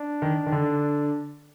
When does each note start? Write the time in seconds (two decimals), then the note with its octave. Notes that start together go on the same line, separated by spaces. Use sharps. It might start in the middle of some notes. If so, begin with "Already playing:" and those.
Already playing: D4
0.22 D#3
0.46 D#3
0.52 D3